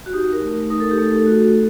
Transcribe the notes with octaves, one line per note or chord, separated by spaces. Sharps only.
F#4
D#4 G4
A#4
A3
D#4 A#4
A4
G4
A3 A4
F#4